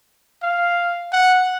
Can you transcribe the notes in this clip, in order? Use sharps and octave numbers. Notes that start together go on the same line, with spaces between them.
F5
F#5